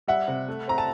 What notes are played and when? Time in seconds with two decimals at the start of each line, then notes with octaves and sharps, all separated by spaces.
0.08 G3 E5 F#5
0.28 C3
0.48 A3
0.67 C4 A#5
0.78 A5